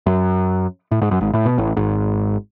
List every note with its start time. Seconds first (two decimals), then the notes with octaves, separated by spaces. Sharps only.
0.06 F#2
0.91 A2
1.02 G#2
1.11 F#2
1.21 G#1 G#2
1.34 A2
1.45 B2
1.58 A1 A2
1.77 G#1 G#2